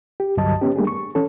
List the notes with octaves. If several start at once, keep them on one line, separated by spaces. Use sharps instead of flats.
G4
C2 G2 D3 F#3 D#5 A5
B3 C#4 G4
G3 A3 A#3 D4 G4 G#4
C#6
E3 C#4 A4